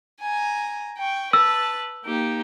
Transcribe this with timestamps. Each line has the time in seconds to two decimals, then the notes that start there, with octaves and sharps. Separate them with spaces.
0.22 G#5 A#5
0.98 G5 C#6
1.33 B4 A5 E6
2.05 A#3 D#4 G4